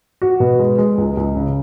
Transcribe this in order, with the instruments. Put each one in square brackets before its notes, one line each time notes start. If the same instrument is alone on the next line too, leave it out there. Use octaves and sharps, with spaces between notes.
[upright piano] F#4
B2
G#3
G#3
C#2
C#2
C#3